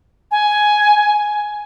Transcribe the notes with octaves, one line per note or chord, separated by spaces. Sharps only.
G#5